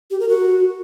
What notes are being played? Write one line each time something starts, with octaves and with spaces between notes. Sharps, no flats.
G4
A#4
F#4